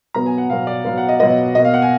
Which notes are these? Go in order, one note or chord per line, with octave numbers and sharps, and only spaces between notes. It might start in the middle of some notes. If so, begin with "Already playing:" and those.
B2 F#3 B3 A#5
G#5
F#5
B2 F#3 B3 F5
D5
B2 F#3 B3 F5
F#5
D#5
B2 F#3 B3 D#5
B2 A#3 D#5
F5
F#5
G#5